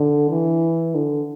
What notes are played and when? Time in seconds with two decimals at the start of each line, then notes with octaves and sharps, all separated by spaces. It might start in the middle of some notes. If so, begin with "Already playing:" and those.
Already playing: D3
0.30 E3
0.95 D3